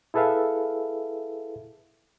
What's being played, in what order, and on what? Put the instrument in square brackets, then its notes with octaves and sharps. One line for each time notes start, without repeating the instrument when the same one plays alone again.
[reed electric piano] E4 G#4 A4 B4 E5 F5